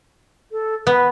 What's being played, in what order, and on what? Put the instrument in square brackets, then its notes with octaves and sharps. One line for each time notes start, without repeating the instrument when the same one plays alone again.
[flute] A4
[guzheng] B3 [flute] B4